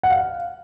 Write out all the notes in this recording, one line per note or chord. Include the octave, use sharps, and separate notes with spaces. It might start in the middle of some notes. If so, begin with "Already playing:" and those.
F#5
F5